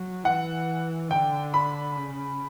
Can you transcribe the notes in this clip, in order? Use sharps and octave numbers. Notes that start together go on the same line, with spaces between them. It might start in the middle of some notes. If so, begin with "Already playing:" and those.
Already playing: F#3
E3 F#5
D3 G5
B5
C#3